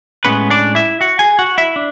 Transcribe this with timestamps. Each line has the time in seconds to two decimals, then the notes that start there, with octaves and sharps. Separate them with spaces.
0.25 A2 G#3 B3 C#4 B4
0.50 D4 D5
0.75 E4 E5
1.01 F#4 F#5
1.19 G#4 G#5
1.39 F#4 F#5
1.58 E4 E5
1.76 D4